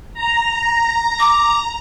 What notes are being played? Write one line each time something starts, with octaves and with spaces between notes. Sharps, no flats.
A#5
D6